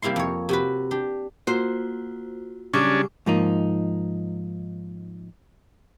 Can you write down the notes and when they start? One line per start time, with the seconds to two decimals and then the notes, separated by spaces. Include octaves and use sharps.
0.02 C3 G3 A#3 E4 C6
0.16 F2 C#5
0.49 C3 F#4 B4
0.91 D4 G4
1.47 A#3 F4 F#4 C5
2.74 C#3 F#3 G3 C#4 D4 C#6 D6
3.26 G#2 F3 A#3 D#4